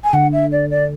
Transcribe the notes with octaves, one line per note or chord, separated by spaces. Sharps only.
G#5
D3 F#5
E5
D5
D5